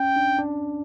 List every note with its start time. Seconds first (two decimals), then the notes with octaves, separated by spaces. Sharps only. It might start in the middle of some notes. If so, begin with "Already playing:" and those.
Already playing: C#4 G5
0.16 D4
0.39 D4